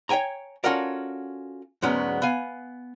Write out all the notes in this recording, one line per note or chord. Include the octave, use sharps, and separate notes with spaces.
C#5 E5 G5 G#5 A#5
C#4 F4 F#4 A4 A#4 D5
D2 G#2 F#3 G#3 B3 C#4
B3 F5 G#5